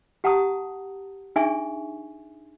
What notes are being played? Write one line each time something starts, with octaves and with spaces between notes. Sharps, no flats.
G4 F#5 A5 A#5 D#6
D4 D#4 G#4 E5 G#5 C#6